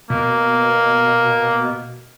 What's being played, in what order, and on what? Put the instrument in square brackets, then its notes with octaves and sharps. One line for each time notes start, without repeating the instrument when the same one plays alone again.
[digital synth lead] B2 [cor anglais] A#3